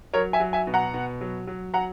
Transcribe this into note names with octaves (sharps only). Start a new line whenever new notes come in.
F#3 A#4 C#5
E5 G#5
F#3
E5 G#5
B2
F#5 A#5
B2
F#3
F#3
F#3 F#5 A#5